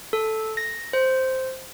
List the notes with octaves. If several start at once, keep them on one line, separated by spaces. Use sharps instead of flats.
A4
A#6
C5